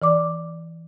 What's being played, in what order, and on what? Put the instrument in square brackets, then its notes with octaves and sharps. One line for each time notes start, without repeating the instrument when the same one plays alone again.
[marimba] E3 D5 D6